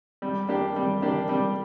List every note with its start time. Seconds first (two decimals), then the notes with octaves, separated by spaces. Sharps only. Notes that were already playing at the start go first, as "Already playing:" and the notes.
0.22 G3
0.49 A#3 D4 G4
0.76 G3
1.02 A#3 D4 G4
1.29 G3